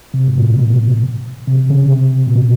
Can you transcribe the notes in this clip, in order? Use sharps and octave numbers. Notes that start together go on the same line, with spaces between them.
C3
G#2
A2
A#2
B2
C3
C#3
C3
A#2
B2